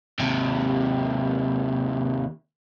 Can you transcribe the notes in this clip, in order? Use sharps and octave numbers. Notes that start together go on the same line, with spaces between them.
D#2 C3